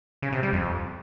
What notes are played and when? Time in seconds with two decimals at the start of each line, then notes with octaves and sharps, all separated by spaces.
0.22 C#3
0.33 C3
0.43 G3
0.53 F2